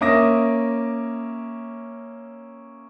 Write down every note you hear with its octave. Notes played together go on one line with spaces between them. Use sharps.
A#3 C#4 E5 D6 D#6 A#6